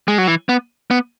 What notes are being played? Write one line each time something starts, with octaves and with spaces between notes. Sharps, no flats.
G#3
F#3
E3
B3
B3